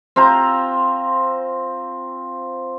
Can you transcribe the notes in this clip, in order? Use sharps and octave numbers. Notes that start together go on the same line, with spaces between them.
C4 F4 C5 A#5